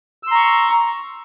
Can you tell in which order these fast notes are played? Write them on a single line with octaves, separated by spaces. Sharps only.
E6 C6 A#5 C#6